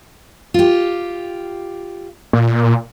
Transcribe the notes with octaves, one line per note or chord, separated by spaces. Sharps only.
F4 G4
A#2